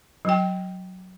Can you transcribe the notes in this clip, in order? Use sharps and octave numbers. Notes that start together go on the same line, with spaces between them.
F#3 G5